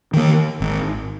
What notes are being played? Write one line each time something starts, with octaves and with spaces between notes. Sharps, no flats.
D#3 A#3
G#1